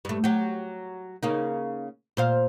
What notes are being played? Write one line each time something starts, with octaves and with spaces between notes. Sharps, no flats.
G2 A3
F#3 G4
C#3 A#3 D#4
A#2 C5 F5